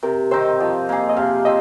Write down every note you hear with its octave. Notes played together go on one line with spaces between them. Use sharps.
C3 A#4
D#3 C4 D#4 C5
F3 D#5
A#3 G#4
D#5
C3 F5
C4 D#5